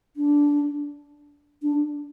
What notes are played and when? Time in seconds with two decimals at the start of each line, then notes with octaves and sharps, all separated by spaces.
0.16 D4
1.62 D4